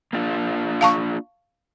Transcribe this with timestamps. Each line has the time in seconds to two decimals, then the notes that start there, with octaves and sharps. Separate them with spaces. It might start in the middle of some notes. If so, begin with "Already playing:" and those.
0.13 A#3 D4 F4
0.81 F5 A5 C#6